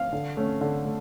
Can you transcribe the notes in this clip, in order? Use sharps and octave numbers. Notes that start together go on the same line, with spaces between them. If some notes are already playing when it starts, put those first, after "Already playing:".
Already playing: F5
D3
A3 C#4
D3
A3